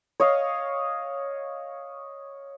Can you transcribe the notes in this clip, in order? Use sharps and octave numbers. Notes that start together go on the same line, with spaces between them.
C#5 D#5 F5